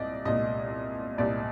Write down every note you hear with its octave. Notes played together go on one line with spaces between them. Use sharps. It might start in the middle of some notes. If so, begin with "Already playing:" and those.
Already playing: C2 A#2 D5 D#5
C2 A#2 D#5
C2 A#2 D5